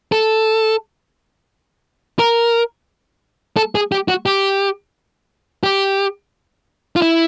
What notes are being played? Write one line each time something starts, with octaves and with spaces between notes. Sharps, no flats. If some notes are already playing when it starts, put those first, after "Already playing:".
A4
A#4
A4
G#4
G4
F#4
G4
G4
F4
E4